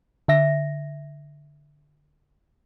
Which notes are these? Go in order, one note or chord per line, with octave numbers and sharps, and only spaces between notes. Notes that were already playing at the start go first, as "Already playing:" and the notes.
D3 E5 A#6